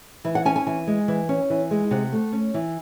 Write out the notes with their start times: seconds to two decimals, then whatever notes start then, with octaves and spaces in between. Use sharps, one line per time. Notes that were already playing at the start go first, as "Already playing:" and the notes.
0.25 E3
0.35 F#5
0.45 C#4 G#5
0.56 G#5
0.67 E3 G#5
0.87 G#3
1.08 E3
1.29 C#4
1.50 E3
1.71 G#3
1.91 C3 F#5
2.12 A3
2.33 C#4
2.54 E3